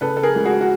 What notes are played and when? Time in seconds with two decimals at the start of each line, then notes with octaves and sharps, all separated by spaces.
0.01 C#3 A4 B4
0.17 A4
0.23 G#4 A#4
0.35 C#2
0.45 F#4 G#4
0.61 F#4